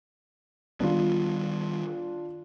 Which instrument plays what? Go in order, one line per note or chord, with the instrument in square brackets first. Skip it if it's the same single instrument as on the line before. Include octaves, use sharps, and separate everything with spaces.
[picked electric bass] D#3 G3 B3 [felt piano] D4 F4